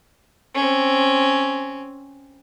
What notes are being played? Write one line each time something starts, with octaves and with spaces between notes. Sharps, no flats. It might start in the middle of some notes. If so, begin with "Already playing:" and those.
C4 C#4